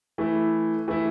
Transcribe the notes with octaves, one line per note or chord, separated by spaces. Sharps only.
E3 A3 E4
E3 A3 E4